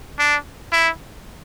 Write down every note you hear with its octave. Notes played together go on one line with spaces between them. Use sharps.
D4
E4